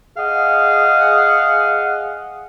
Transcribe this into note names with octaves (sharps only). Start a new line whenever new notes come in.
G#4 D#5 F5 F#5